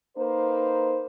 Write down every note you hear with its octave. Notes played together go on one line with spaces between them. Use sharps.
A#3 D#4 B4 C5